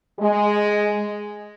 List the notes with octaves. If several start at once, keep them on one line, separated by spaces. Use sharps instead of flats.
G#3